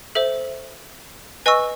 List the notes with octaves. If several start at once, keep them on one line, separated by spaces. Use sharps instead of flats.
A4 C5 E5
B4 D#5 G#5 C#6 E6